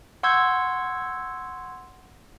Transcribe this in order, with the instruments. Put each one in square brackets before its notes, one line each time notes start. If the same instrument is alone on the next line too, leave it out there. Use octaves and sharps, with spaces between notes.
[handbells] F#5 C6 C#6 E6 G6 G#6